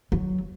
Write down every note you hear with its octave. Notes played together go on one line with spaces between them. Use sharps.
F#3